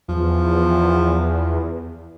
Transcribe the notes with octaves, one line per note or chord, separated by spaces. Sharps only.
E2 F3